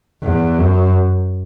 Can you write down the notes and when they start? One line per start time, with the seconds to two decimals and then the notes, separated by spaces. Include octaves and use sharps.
0.23 E2
0.59 F#2